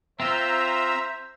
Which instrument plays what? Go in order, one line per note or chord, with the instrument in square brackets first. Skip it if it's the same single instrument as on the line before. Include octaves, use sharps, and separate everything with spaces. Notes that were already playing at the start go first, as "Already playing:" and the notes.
[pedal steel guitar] C4 F4 [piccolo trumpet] C5 [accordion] E5 A#5 E6